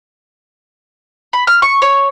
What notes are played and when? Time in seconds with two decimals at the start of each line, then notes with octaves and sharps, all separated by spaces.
1.33 B5
1.47 F6
1.62 C#6
1.82 C#5